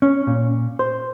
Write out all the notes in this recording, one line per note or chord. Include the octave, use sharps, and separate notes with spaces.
C#4
A#2
C5